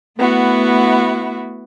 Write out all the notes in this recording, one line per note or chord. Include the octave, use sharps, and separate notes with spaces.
A3 B3 E4 F#4